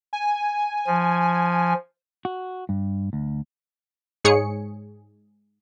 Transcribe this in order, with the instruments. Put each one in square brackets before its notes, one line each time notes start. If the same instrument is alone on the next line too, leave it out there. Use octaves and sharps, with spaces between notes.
[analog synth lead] G#5
[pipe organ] F3
[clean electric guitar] F#4
G2
D2
[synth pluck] G#2 G#4 C#5 C#7